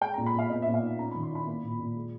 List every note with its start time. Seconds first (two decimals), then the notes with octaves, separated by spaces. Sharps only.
0.01 G#3 G5
0.14 A#5
0.18 A#2
0.26 B5
0.34 A#2 F5
0.50 B3 D#5
0.62 E5
0.67 A#2
0.74 F5
0.82 D#4
0.99 C#4 A#5
1.11 B5
1.15 D#3
1.23 C6
1.31 E4 B5
1.47 A#3
1.64 A#2
1.79 A#2
1.96 G#3